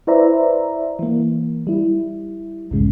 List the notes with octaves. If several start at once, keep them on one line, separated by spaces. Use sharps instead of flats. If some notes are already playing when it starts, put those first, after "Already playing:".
E4 B4 C5 D5 E5 A#5
E3 A#3
G3 E4
B1 E2 G#2 C#3 G#3